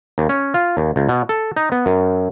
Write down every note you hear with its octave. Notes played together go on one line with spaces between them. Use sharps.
D#2
C#4
F4
D#2
C#2
B2
A4
D#4
B3
F#2